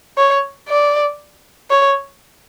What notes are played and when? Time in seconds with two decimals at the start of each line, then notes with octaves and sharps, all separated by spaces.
0.18 C#5
0.69 D5
1.70 C#5